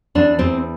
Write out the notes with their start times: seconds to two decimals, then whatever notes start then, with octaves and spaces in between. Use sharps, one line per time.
0.15 E2 D4
0.39 E2 C4